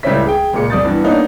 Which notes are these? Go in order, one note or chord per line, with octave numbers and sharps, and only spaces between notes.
C#2 A2 G3 C#4 E5 B6
G#4 G5
C#2 A#2 G#4 D6 C#7
F#2 D5 D#6 G6 A6
G2 E3 B3
A#3 B3 D4 D#4 C#5 F#5